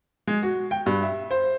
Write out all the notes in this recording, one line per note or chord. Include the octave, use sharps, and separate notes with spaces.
G#3
F#4
G5
G2
E5
C5